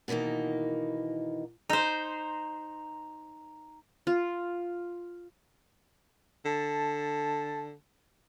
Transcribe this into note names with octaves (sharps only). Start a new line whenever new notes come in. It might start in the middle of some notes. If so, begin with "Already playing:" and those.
B2 D#3 E3 A#3 D#4
D#4 C5 A#5
F4
D3 A5